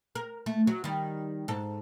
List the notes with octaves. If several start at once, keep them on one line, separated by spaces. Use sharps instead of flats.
A#4
A3
F#3
D#3 G3
G#2 A4